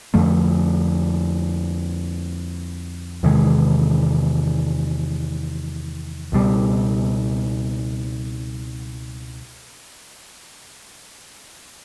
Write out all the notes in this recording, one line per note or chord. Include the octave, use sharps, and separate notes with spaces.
F2 D3 F3 A3
E2 C3 D#3 G#3
C#2 B2 G3